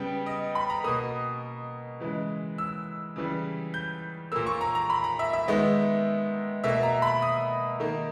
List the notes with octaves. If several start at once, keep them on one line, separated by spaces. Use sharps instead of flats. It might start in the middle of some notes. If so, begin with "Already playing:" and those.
Already playing: C#3 G3 B3 G5
D#5
B5
A#5
B2 A#3 D#6
C#3 E3 G#3
E6
C#3 E3 G3
G6
A#2 A#3 E6
C#6
A#5
A#5
B5
A#5
E5
E5
D#3 G#3 B3
B2 A#3 E5
A#5
B5
D#6
D#3 A#3